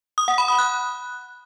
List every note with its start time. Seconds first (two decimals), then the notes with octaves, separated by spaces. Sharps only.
0.18 D#6
0.28 F#5
0.38 B5
0.48 D#6
0.59 F#6